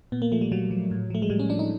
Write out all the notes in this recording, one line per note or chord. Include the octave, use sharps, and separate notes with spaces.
A#2 B3
A#3
F3 A3
G3
A#2 F#3
F3
A2
F3 A3
G#3
A2 G3
C#4
F3 D4
D#4